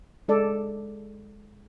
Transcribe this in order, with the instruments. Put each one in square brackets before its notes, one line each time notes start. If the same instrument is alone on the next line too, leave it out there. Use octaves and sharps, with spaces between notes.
[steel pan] G#3 A4 D5